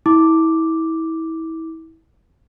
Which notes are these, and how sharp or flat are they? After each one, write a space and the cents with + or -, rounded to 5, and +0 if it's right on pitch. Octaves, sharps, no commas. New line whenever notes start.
E4 -30 D6 +0